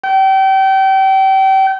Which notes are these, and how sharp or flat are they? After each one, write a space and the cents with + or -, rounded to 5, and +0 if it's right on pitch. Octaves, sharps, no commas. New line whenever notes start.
G5 -30